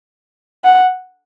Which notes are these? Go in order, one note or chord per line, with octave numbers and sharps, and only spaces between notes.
F#5